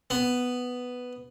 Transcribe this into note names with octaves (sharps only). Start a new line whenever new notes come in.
B3